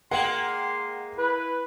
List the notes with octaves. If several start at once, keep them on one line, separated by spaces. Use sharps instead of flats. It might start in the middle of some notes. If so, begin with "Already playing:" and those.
G#3 A#3 F#5 G5 C6 F#7
E4 B4